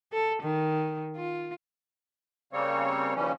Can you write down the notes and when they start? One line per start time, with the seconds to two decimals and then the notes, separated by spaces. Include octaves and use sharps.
0.12 A4
0.43 D#3
1.16 F4
2.53 C#3 G3 A#3 C4 C#5
3.15 D#2 C#3 E3 F3 G3 C#4